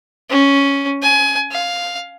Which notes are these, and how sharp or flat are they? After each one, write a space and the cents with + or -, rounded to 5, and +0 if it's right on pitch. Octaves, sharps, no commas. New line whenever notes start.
C#4 +5
G#5 +25
F5 +5